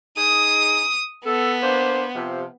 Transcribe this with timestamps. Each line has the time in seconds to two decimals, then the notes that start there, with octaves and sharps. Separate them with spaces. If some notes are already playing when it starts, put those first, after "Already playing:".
0.17 D#4 G#4 D#6
1.26 B3 A4
1.62 A#3 D4 C5
2.15 C3 F3